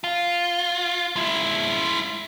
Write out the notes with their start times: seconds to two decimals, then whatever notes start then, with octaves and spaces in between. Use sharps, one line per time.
0.04 F4
1.16 G#3 E4